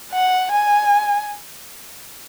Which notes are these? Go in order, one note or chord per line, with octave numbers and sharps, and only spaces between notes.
F#5
G#5